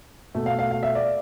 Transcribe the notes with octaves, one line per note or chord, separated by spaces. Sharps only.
B2 A3
F5
F5
F5
E5
D5